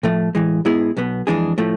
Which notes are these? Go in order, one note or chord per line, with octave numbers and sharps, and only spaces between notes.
A2 F3 A3
A2 E3 G#3
G#2 G#3 B3 E4 G#4
B1 B2 B3
F2 E3 G#3 D4 G#4
A2 F3 A3